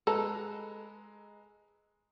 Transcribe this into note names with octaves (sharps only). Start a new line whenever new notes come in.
G#3 A4 B4 A#5